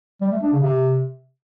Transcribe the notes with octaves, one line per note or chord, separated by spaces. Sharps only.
G3
A3
D4
C#3
C3